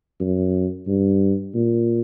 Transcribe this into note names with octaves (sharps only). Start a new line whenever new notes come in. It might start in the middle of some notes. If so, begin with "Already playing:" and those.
F#2
G2
A#2